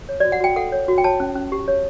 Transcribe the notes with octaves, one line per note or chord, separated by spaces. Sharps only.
C#5
F#4 D5
F#5
F#4 G5
A4 F#5
C#5
F#4
G5
C#5 A5
C#4
C#4
G4
C#5